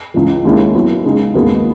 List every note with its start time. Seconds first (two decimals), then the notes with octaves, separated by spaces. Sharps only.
0.14 C#2 C#3 E3
0.45 D#2 D#3 G#3 C#4 E4
0.75 F#3 B3 E4
1.05 C#3 G#3 D#4 G#4
1.34 D#2 D#3 G#3 B3 F#4